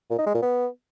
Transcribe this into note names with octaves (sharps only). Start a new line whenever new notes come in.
A#2
D#4
G#3
A#2
B3